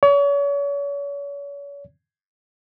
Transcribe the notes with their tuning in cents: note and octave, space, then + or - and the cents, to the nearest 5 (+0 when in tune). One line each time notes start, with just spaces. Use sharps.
C#5 +40